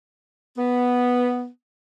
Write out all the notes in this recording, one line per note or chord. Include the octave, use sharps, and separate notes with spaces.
B3